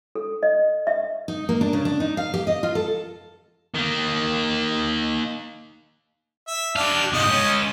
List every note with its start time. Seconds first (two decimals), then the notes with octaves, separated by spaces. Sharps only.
0.15 A4
0.43 D#5
0.87 E5
1.28 D#4
1.49 A#3
1.61 D4
1.73 C#3
1.85 D4
2.00 D#4
2.17 F5
2.34 G4
2.47 D#5
2.63 F4
2.75 A4
3.74 D#3 A#3
6.47 E5
6.76 D4 G4 F5
7.13 G#2 C3 D#5
7.29 G#3 C#4